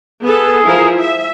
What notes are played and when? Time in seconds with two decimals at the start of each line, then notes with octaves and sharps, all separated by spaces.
0.23 B3 G#4 A4
0.64 F3 E4 A#4
0.99 E5